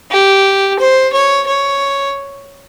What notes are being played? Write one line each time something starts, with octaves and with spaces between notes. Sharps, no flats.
G4
C5
C#5
C#5